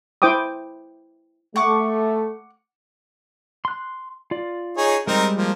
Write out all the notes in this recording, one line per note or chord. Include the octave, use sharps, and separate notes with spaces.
E4 C5 G5 D6 D#6
A3 F#5 C#6 D6
C6 F#6
F4 D5
D#4 G#4 C#5
G3 G#3 C4 D#4 A#4
F3 A#3